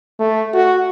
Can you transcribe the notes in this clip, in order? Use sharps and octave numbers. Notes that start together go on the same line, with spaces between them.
A3
F#4